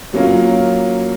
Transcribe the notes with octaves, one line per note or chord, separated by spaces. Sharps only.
F#3 A#3 C#4 F4